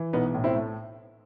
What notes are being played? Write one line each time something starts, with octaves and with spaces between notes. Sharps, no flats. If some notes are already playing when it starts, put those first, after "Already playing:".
Already playing: E3
B1 B3 D#4
A2
C4 E4
A3